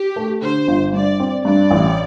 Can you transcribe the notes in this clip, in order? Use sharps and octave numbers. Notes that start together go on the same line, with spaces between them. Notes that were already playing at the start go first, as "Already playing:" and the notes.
Already playing: G4
A3
D3 C5
G1
G2 D5
C4
G2 D5
A1